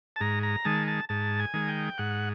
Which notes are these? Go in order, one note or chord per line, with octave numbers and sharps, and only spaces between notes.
A5
G#2 A#5
A#5
D#3 G#3 A5
A5
G#2 A5
G#5
D#3 G#3
G5
G#2 F#5